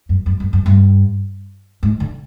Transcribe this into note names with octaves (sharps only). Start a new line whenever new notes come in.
F#2
F#2
F#2
F#2
G2
G#2
D3